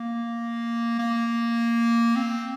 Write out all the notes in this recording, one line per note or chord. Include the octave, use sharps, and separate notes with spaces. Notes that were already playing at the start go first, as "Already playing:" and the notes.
Already playing: A#3
A#3
C4